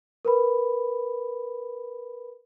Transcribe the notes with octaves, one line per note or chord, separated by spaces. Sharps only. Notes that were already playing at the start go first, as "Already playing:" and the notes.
A#4 B4 B5